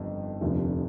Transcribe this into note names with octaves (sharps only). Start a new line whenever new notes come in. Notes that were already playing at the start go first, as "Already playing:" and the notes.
Already playing: G1 F2 D#3 G3
F1 D#2 D3 F3